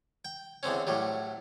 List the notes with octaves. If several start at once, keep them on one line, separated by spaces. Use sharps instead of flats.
G5
E2 D3 C4 C#4
A2 F#3 G3